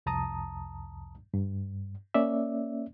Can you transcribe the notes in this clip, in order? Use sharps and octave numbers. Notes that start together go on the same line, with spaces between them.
C2 F2 A5 A#5 D#6
G2
A#3 C#4 D5 E5